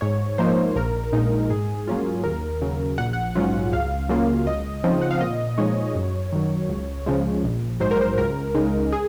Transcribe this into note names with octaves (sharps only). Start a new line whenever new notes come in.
G#2 C#5
F3 A#3 D#4 C5
A#1 A#4
A#2 G#3 D#4
G#2 G#4
F#3 A#3 C#4 F4
D#2 A#4
C#3 F#3
A#1 F#5
F#5
G#2 F#3 C#4 F4
C#2 F5
C#3 F#3 A#3 F4
C#2 D#5
C#3 F3 C4 D#4
F#5
F5
A#2 D#5
F3 G#3 D#4 C#5
F#2
D#3 F#3
C#2
C#3 F3 G#3
A#1
G#2 F#3 C5
A#4
C5
C#2 A#4
C#3 G#3 D#4
G#4